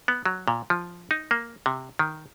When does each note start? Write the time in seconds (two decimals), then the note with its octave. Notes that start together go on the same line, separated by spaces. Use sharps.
0.08 B3
0.26 F#3
0.48 A#2
0.70 F3
1.11 D#4
1.31 A#3
1.66 C3
1.99 D#3